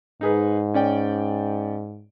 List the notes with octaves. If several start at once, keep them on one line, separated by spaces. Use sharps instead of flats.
G#2 D#4 G#4 B4
C#4 D5 G5